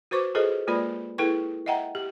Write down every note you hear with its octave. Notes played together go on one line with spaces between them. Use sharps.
F#4 B4 C5 C#6 D6
F4 G#4 A4 B4 C5 D#5
G#3 A#3 F4 B4 D5 B5
E4 G#4 A4 B4 G5 C#6
D#5 E5 F#5 G5 A#5
G4